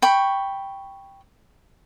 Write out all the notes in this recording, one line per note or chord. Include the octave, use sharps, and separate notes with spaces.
G5 B5 C#6